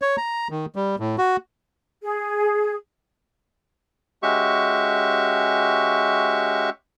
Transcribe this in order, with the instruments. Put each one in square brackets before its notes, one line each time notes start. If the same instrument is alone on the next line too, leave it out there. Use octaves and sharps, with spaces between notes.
[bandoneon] C#5
A#5
D#3
G3
A2
F#4
[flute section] G#4
[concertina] G#3 C#4 F#4 G4 E5 C#6